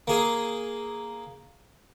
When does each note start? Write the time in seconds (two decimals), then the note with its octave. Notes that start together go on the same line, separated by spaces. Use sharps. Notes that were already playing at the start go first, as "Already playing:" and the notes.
0.07 A#3 G#4